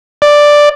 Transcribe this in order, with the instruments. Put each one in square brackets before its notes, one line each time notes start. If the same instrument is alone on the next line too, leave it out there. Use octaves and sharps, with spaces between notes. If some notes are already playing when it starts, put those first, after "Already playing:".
[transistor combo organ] D5